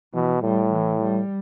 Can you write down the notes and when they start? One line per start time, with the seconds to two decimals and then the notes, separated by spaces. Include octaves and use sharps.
0.13 B2 E3
0.43 A2 G3
0.72 E3
1.02 G3